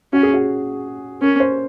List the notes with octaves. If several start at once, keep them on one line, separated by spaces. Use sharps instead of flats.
C#4 F#4
G#4
F#4
C#4 A#4
C5